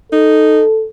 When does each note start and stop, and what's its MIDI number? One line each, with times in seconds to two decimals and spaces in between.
0.12 0.63 63
0.12 0.87 69